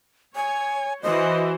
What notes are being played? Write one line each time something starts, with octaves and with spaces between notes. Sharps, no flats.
C#5 G#5
E3 F#4 C5 D#5